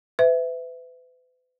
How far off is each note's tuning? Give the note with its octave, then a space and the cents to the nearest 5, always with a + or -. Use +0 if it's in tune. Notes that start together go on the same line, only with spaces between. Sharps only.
B4 +40 E5 +0